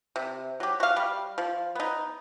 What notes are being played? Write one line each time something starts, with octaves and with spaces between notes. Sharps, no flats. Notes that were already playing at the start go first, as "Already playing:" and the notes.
C3
F#3 G4
F#4 F5
G3
F3
B3 D#4